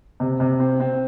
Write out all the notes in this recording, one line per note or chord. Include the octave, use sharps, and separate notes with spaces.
C3
C3
C4
C4